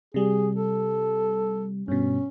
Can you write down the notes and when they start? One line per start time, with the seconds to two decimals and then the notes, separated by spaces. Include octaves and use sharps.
0.14 C3 G3 G#4
0.55 A4
1.88 G2 B2 C#4